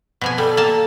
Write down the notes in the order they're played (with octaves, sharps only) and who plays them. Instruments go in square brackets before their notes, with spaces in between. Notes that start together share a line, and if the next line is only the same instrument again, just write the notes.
[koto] B2 F3 G#5
[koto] G3 [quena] A4
[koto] A#3 A5